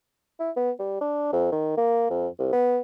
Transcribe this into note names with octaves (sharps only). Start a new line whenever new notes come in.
E4
B3
G3
D4
F2
D#3
A#3
F2
C2
B3